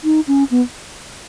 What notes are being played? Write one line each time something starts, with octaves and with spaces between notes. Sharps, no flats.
D#4
C#4
B3